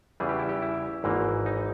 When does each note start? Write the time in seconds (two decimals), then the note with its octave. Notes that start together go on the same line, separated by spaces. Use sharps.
0.20 E2 C#3 E3 G3 G#4
0.29 G4
0.39 E4
0.49 G4
0.62 E4
1.04 G#1 G#2 E3 A#3
1.46 D#4